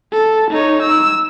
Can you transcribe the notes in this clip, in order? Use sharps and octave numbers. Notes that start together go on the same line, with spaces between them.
A4
D#4 C#5
E6